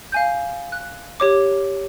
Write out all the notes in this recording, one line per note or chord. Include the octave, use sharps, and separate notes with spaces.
F5 G#5 G6
F#6
G4 C#5 D6